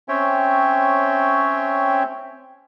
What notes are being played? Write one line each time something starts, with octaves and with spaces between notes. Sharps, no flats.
C4 C#4 C#5 E5 G5